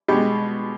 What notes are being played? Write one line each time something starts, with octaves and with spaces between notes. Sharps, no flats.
B2 G#3 G4